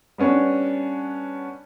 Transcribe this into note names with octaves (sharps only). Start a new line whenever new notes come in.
G3 B3 C#4 D4